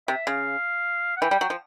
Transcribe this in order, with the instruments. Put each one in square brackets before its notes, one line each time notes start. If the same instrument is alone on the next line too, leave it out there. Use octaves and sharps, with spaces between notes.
[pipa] C3 [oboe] E5
[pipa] C#3 [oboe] F5
[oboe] F#5
[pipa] E3 [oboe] G5
[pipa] G3
F#3
F3